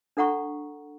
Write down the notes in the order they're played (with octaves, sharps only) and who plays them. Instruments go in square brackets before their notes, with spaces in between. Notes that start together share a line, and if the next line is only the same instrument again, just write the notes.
[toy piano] D4 A4 F#5 A#5 C#6